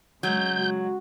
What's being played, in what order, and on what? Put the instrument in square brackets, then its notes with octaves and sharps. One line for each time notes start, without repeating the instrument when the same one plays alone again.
[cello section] C#3 G#3 [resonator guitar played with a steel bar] F#3 [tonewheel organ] G6
[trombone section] F#4